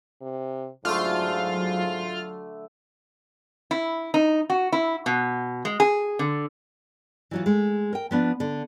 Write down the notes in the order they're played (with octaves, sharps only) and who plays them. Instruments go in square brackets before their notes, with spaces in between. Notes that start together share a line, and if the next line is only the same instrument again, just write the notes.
[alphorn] C3
[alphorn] G#2 [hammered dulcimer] D3 A3 [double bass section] F#3 [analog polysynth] F4 F6
[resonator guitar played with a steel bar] E4
D#4
F#4
E4
B2
G#3
G#4
D3
[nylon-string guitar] E3 F#3 F4
G#3 A3
A#4 G5
F3 B3 D4
D3